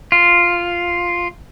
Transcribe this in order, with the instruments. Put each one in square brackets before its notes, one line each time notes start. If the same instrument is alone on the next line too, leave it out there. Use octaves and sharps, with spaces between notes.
[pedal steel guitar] F4